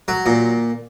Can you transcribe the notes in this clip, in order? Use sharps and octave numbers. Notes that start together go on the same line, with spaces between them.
F#3
A#2